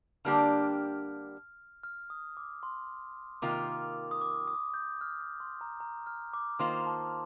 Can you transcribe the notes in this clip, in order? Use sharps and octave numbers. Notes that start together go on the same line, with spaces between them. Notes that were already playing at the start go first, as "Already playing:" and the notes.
D3 G3 A#3 D4 G4 F6
F6
D#6
D6
C6
C3 D#3 A#3 F4 A#4 D6
D#6
D6
D#6
G6
F6
D#6
C6
A#5
A#5
F6
D6
D#3 A#3 F4 C5 C6
A5